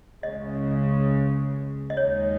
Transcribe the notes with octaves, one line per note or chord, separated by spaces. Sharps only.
C#2 C#3 G#3 D#5
D#5
D#2 D#3 G#3 D#4 C#5